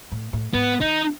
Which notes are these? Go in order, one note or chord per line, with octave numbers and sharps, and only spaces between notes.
A2
A2
G#2 B3
D#3 D#4